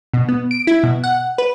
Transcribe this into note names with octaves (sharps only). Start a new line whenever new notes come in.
B2
B3
D7
E4
B2
F#5
B4